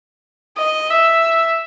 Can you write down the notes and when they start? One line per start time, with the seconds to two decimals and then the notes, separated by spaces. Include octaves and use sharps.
0.58 D#5
0.90 E5